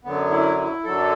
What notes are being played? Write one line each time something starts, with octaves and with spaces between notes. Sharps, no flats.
F#2 D3 F#3 B3
E4
E4
F#2 D3 F#3 A4